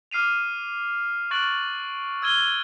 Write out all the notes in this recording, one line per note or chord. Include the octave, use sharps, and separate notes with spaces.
D6 F6 C7 D#7 F7
C#6 F6 F#6 A6 D7 F#7
E6 F6 G#6 A6 D#7 G7